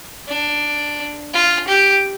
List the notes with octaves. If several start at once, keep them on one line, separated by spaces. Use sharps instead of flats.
D4
F4
G4